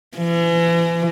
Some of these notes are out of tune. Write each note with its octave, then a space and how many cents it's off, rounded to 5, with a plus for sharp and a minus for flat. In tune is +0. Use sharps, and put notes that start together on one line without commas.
E3 +40